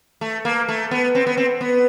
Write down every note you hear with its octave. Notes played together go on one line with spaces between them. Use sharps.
A3
A#3
A3
B3
C4
B3
C4
B3